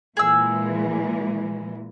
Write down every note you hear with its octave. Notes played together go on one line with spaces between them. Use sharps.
A#2 E3 G#3 G#4 E6